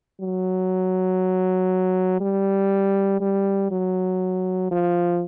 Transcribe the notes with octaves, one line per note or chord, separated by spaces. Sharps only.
F#3
G3
G3
F#3
F3